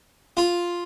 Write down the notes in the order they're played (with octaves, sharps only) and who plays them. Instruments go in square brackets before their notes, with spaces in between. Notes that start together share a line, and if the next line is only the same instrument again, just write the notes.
[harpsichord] F4